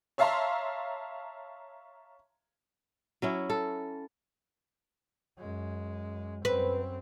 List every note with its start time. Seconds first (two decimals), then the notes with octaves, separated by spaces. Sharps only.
0.18 C#5 E5 F5 A5 A#5 C6
3.22 F#3 C#4 E4
3.50 A4
5.37 F#2 G#3
6.45 F#2 C4 B4